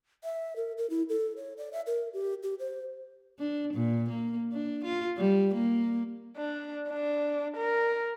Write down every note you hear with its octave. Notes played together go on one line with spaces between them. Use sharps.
E5
A#4
A#4
E4
A4
C#5
D5
E5
A#4
G4
G4
C5
D4
A#2
A#3
D4
F4
G3
A#3
D4
D4
A#4